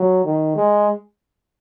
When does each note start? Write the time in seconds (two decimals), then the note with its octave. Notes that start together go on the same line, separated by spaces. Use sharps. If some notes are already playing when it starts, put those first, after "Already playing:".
Already playing: F#3
0.25 D#3
0.56 G#3